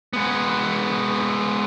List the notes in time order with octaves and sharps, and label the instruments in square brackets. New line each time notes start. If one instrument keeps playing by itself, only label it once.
[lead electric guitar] G#3 B3